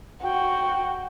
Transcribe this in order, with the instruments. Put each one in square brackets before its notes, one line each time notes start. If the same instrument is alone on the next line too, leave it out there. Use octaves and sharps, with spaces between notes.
[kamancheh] F#4 [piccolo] G5